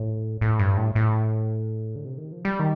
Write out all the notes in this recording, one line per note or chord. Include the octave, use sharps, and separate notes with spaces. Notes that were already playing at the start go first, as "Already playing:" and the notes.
Already playing: A2
A2
G2
A2
A2
D3
C3
D#3
F3
G3
D#3